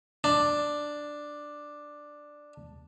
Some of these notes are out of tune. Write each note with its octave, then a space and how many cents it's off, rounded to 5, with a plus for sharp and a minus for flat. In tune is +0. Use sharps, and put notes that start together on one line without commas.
D4 +5